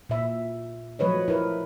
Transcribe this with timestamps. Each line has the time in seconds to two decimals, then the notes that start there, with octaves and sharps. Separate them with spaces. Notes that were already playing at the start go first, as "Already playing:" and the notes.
0.09 A#2 E5
0.99 F3 F#3 A3 B4 C#5 D#5
1.28 E4 A#4 B4